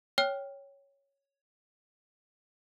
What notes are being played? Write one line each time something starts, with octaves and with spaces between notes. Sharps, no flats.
C#5 G5 F6